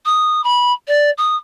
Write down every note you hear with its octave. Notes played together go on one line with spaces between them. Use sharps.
D#6
B5
D5
D#6